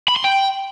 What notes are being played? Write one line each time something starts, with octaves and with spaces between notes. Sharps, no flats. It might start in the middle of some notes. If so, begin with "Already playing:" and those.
B5
C6
G5